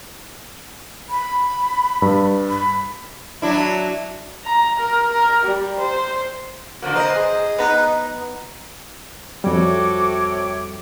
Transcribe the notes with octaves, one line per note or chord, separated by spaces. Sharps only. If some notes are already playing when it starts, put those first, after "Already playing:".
B5
G2
B5
F#3 D4 E4
A#5
A#4
A#4
G3
C5
D3 F3 A#3 F#4
B4 C5 D#5 A#5
G#4
B3 D#4 B4 A#5 F#6
F2 C3 G3 F#4 A4 C#5 D6